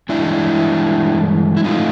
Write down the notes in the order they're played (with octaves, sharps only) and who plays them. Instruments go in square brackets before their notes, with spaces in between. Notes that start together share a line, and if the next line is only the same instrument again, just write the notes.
[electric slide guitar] G2 E3 G#3 D4 E4
E4
A2 F3 A3 D#4 F4